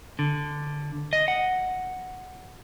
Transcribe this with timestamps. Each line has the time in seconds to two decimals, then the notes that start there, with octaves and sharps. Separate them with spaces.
0.19 D3
1.13 D#5
1.28 F#5